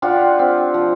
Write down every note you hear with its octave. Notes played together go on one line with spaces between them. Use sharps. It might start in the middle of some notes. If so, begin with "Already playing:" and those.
D4 F4 G4 F#5
C4
F3